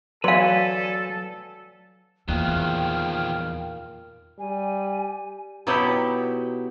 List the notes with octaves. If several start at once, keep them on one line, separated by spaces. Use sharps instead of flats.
F#3 A4 B4 D5 F5 G#5 C6
E2 A#2 D#3 F3 G5 F6 F#6
G3 G#5
B2 F#3 D#4 E4 G4